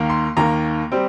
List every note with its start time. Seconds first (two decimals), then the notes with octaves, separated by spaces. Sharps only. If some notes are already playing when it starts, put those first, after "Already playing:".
Already playing: D#2 D#3 A#3
0.09 C6
0.37 D#2 D#3 A#3 A#5
0.92 G3 C4